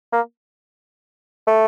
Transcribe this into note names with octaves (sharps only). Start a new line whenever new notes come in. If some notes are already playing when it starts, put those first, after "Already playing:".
A#3
A3